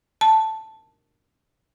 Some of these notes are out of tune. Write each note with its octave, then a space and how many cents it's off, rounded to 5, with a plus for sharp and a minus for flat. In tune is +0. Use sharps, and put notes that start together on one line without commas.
A5 +0